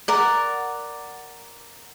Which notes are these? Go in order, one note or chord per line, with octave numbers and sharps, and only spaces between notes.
A#4 D5 F#5